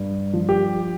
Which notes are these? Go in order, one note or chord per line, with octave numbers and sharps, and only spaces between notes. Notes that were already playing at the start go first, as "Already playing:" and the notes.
Already playing: G2
F3
G4